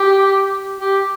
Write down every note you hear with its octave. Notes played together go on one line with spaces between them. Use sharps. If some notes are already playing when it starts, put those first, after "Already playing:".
Already playing: G4
G4